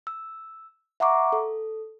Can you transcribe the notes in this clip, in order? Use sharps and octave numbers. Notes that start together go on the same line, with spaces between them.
E6
E5 F#5 A#5 C#6 D6
A4